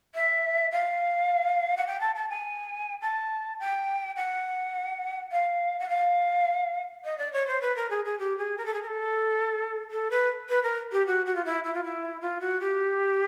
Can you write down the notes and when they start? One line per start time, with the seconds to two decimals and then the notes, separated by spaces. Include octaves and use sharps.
0.15 E5
0.71 F5
1.77 F#5
1.86 G5
2.00 A5
2.15 A5
2.29 G#5
3.01 A5
3.59 G5
4.16 F#5
5.31 F5
5.79 F#5
5.89 F5
7.04 D#5
7.18 D5
7.33 C#5
7.47 C5
7.61 B4
7.76 A#4
7.90 G#4
8.05 G#4
8.19 G4
8.38 G#4
8.57 A#4
8.65 A4
8.73 G#4
8.82 A#4
8.87 A4
9.91 A4
10.10 B4
10.49 B4
10.63 A#4
10.92 G4
11.06 F#4
11.25 F#4
11.35 F4
11.44 E4
11.63 E4
11.74 F4
11.83 E4
12.21 F4
12.40 F#4
12.60 G4